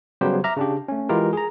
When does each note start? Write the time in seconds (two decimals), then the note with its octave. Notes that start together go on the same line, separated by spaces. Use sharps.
0.21 C#3 F#3 G3 B3 G4 C5
0.44 E5 A#5 D6 F6
0.57 C#3 D4 G4
0.88 A3 C#4
1.09 E3 G#3 E4 F4 G4 A#4
1.33 G#4 A#5